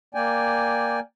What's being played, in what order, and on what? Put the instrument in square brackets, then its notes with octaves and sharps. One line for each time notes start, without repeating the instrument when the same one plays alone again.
[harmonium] A#3 D5 G5 G#5